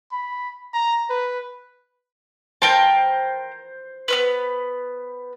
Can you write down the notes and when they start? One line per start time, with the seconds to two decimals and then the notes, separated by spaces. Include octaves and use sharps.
0.12 B5
0.73 A#5
1.10 B4
2.62 A#4 C5 G5 A5
4.08 B3 C#4 B4